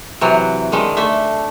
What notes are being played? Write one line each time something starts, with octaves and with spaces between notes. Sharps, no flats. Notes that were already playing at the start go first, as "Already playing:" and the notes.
C3 E3 F#3
D3 D#3 G#3
A3 D4 E5